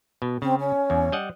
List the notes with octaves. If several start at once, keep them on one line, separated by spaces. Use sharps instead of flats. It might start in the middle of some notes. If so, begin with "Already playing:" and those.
B2
C#3 C4
C#4
E2
G3 D#5 F#5